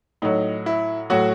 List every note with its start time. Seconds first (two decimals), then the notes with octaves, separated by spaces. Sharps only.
0.22 A2 F#3 D#4
0.66 E4
1.10 A2 F#3 F#4